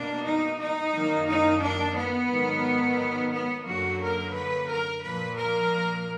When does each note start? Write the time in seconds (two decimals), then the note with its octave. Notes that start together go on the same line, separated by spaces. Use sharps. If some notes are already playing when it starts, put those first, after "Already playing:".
Already playing: B2 A#3 D4
0.27 D#4
0.61 D#4
0.94 F#2 D#3 A#3
1.29 D#4
1.63 D4
1.96 B3
2.30 G#2 D#3 F#3
3.33 B3
3.66 F#2 D3 F#3 A#3 F#4
4.01 A#4
4.35 B4
4.69 A#4
5.02 A#2 F3 A#3 B4
5.37 A#4